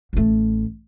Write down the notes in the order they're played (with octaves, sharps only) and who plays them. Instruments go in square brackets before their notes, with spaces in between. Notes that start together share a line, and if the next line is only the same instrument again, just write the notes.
[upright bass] A1 A3